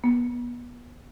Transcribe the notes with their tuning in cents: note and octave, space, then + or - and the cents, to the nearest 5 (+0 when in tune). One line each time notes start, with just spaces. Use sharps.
B3 -25